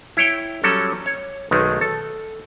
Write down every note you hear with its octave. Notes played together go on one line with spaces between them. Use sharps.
E4 C#5 G5
F#3 G3 C#4 A4
C#5
B1 D#3 G#3 A3
A4